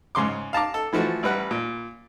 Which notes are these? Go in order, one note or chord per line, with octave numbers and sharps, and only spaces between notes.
G#2 C#3 C6 D6
F5 A5 A#5 D6
A4
E3 F3 A3 F#4
A1 G3 B4 F#5
A#2